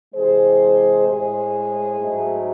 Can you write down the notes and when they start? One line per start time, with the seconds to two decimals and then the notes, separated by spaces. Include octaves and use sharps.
0.14 C3 E3 G#3 G#4 C5
1.07 A2 G#3 G#4 C5
2.00 G#2 F#3 A3